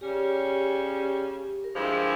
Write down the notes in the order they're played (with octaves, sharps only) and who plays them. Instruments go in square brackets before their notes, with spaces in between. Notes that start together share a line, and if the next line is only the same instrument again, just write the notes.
[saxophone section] C#3 G3 C#4 [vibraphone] G4
[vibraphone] A#4
[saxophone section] G2 F3 G#3 E4 G4 [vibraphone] G#4